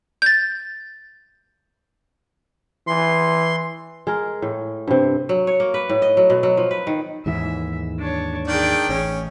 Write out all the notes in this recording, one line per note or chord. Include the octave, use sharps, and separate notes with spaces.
G6 A6
E3 C6
G#3 A#4
A2
G2 C3
F#3
C#5
A#3
B4
A2
D#5
F#3
B2
F#3
F3
B4
D#3
D#2 G#2 E3 E5
D4 C#5
D#3 D4 G#4 D5 G5
A1 C#4